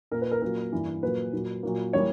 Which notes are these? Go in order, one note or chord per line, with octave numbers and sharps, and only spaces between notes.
A#2 A#3 A#4
B4
A#4
A#2 F#3 A#3 A#4
G2 E3 A#3
A#2 F#3 A#3 B4
A#2 F#3 A#3
A#2 F#3 A#3
E3 G3 A#3 C#5